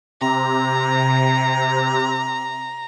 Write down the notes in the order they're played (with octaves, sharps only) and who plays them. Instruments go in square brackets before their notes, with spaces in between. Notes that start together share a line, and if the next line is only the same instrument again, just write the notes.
[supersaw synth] C3 [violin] A#5